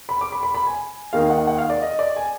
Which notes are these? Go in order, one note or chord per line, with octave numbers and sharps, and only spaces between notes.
B5
D6
B5
B5
B5
G#5
D#2 D#3 A#3 D#4 F5
F#5
F#5
F5
D5
D#5
D5
G#5